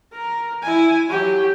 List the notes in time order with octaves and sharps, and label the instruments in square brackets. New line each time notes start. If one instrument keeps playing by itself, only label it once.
[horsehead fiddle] A#4
E4 G#5
F#3 G4